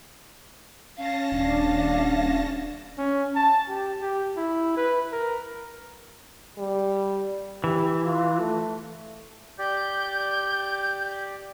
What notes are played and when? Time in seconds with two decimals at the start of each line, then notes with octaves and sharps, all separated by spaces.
0.97 C#4 F5 A5 A#6
1.32 D#1 D4
2.98 C#4
3.36 A5
3.68 G4
4.02 G4
4.37 E4
4.77 B4
5.12 A#4
6.58 G3
7.64 E3 G4
8.04 F4
8.39 A3
9.59 G4 D5 G6